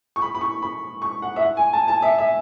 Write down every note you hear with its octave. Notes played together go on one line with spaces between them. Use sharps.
C#6
B5
B5
C#6
B5
C#6
F#5
E5
F#5
G#5
A5
A5
E5
E5